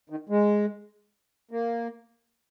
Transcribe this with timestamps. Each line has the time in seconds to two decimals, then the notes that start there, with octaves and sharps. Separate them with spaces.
0.10 D#3
0.29 G#3
1.51 A#3